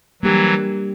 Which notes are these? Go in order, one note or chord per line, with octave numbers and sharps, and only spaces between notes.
E3 F#3 G3 A#3 D4 G4 A#4